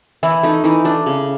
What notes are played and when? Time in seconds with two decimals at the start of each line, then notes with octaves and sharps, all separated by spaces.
0.23 E3 E4
0.43 A3 D#4
0.64 E3 D#4
0.85 A3 D4
1.06 C#3